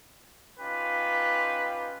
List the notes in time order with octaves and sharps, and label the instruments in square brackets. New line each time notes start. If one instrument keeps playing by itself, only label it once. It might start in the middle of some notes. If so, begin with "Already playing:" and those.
[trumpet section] C#4 D#4 F4 G4 B4